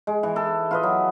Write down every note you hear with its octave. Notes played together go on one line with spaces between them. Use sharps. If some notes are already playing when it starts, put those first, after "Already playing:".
G#3
E3
A4
F4 B4 D#5
F#3